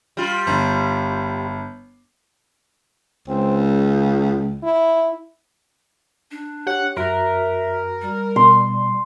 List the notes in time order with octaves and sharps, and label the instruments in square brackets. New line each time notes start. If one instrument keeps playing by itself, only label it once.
[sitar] G3 F4
[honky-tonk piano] G1
[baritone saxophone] C#2 [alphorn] C4
[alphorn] C#3
E4
[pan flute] D4
[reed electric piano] G4 C#5 [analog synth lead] F#5
[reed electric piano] F#2 F#4 F#6 [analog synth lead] A#4 [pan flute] E5
[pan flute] G3
[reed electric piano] B2 [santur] C6